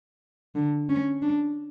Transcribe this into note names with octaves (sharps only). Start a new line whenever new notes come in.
D3
C#4
D4